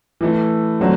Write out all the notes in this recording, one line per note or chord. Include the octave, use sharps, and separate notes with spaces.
E3 A3 E4 A4
D3 F#3 A3 C4